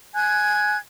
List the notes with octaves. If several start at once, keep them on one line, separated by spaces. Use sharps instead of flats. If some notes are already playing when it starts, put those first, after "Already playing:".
G#5 F#6 G#6